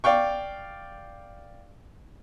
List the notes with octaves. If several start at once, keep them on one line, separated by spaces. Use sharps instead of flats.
D5 F5 G5 C#6